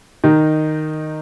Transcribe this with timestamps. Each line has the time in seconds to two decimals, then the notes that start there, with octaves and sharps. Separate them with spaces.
0.24 D#3 D#4